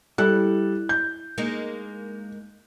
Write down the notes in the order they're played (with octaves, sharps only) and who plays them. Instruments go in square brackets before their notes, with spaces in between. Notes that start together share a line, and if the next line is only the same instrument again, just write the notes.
[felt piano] G3 A4 F#6 [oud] E4
[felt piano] G6
[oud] G#3 A#3 D#4